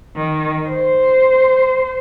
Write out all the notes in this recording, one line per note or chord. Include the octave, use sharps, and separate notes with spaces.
D#3
C5